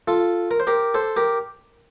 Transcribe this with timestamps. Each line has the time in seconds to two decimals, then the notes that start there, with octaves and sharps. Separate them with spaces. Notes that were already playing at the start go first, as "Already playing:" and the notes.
0.08 F4 A4
0.51 A#4
0.60 C5
0.67 G4 A#4
0.94 A4 C5
1.16 G4 A#4